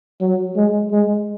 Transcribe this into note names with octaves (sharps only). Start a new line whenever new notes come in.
F#3
G#3
G#3